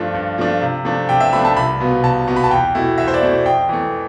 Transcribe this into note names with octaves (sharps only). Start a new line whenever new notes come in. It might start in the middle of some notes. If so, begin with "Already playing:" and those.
Already playing: G2 F3 A3 D4 F4
G2
F3 A3 D4 F4
C3
F3 A3 D4
C3 G5
E5
F3 A3 D4 B5
A5
C2 B5
B2 B3 F4
C2 A5
B2 B3 F4
B5
A5
E2 G5
B2 A3 E4
E2 E5
C5
D5
B2 A3 E4
F2 G5
E3 A3